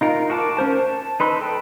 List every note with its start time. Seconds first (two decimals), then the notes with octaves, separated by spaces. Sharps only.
0.01 D#4 F4 A#4
0.30 F#4 A#4 A5 C6 D6
0.57 C#4 A#4 C5 A5
0.79 A5
1.20 D#4 B4 C6 E6
1.41 A4 B4 G5 A5